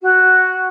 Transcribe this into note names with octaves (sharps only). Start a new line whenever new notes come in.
F#4